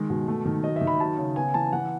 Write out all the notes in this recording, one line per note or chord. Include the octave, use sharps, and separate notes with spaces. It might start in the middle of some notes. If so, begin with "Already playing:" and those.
Already playing: D#3 G#3
B2
A3
D#3
F#3 D#5
E5
D#3
B5
F#3 A5
C#3
B3 G#5
E3 A5
E3 F#5